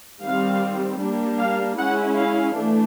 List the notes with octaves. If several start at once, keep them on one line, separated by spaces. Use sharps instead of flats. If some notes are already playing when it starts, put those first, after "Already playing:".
D#3 G3 C4 F5
G3 A#3 D4
F5
G#3 C#4 E4 F#5
F5
E3 A3 D4